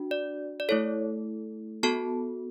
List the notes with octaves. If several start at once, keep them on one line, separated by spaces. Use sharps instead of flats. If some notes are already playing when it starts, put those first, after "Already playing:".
Already playing: D4 F#4
D5
D5
A3 E4 A4 C#5
B3 F#4 A4 A5